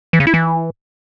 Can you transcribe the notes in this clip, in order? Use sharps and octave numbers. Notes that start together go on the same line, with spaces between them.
E3
C#3
E4
E3